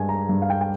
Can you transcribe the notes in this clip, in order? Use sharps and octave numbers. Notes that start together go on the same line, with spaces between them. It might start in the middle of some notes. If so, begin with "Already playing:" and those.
Already playing: G2 G#3 G#5
A#5
G2
F5
G5
G5